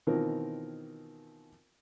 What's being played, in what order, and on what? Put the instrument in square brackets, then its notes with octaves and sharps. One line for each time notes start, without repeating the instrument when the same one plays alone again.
[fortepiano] B2 D#3 E3 C4 F4 A#4